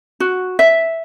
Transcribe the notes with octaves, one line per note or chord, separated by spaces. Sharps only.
F#4
E5